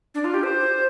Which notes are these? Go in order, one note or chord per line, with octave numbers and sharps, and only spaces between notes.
D4
F4
G4
C5